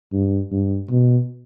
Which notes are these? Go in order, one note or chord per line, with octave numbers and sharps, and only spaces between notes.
G2
G2
B2